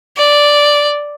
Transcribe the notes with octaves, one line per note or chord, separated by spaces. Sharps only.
D5